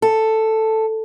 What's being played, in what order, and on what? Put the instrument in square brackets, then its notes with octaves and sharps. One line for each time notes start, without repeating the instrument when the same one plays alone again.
[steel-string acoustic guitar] A4